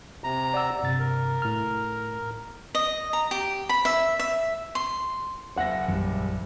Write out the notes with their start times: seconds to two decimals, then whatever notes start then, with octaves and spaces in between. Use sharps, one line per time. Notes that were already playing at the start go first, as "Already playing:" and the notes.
0.24 C3 A#5
0.54 D5 F#5 E6
0.83 G2 C3 A6
1.00 A#4
1.42 A2 F6
2.75 D#5
3.13 A#5
3.31 G4
3.69 B5
3.85 E5
4.19 E5
4.75 C6
5.58 F#1 E5 F#5 A#6
5.88 A#1 F#2 E3 G3